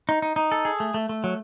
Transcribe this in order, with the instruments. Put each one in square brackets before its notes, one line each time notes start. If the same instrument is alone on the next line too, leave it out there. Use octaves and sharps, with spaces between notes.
[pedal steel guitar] D#4
D#4
D#4
A4
G#4
A3
A3
A3
F#3